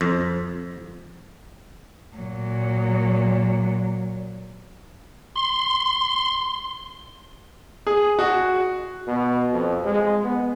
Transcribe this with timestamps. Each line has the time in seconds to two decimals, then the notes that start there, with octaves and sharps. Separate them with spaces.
0.01 F2
2.16 A#2 F#3
5.36 C6
7.87 G#4
8.19 F#4
9.07 B2
9.53 F2
9.85 G#3
10.24 B3